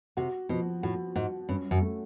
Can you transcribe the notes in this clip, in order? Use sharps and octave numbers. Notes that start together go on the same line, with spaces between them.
C3 F#4
B2 F3
A2 F#4
G#2 F#4
G2 C#4
F#2
A3